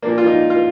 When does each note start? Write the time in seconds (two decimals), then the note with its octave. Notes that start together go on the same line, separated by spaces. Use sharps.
0.02 A#2 F3 A#3 D4
0.18 F4
0.26 D#4
0.50 F4